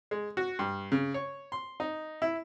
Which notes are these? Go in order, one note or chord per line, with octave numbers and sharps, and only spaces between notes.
G#3
F#4
G2
C#3
C#5
C6
D#4
E4